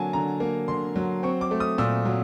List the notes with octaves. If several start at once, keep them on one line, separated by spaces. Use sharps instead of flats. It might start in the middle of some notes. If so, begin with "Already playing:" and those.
Already playing: D3 F#3 A#3 G#5 A5
D3 A#5
A#3
D3 C6
F#3
C4 C#6
D6
A3
D#6
A#2 E6
F#3